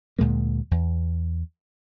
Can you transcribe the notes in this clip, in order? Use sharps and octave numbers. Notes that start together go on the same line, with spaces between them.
D2 A#2 G#3 A#3
E2